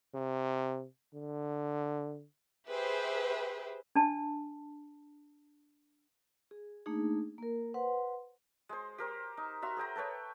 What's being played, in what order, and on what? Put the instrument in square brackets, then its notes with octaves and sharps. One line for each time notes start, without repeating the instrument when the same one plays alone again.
[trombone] C3
D3
[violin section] G4 G#4 B4 C5 E5
[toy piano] D4 A5
[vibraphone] G#4
A3 A#3 D4 D#4 G#4
A#3 A#4
B4 C5 F#5 C6
[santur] G#3 C5
G4 A#4 C5
D#4
F#4 E5 A#5 C6
G#4 C5 G5 A#5
A4 B4 C#5 G5